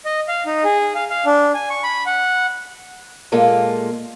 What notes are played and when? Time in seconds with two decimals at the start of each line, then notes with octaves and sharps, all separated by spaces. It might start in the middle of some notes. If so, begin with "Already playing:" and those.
0.05 D#5
0.28 F5
0.46 D#4
0.64 G#4
0.95 F5
1.10 F5
1.26 D4
1.54 G#5
1.70 C#6
1.83 B5
2.06 F#5
3.32 A#2 G#3 A#3 F4 A4